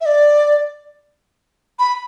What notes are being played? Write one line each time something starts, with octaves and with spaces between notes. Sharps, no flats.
E5
D5
B5